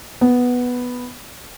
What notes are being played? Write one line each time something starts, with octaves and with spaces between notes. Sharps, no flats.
B3